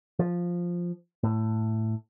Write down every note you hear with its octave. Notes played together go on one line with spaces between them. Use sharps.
F3
A2